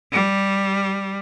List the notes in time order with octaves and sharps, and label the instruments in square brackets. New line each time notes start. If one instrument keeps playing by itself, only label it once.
[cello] G3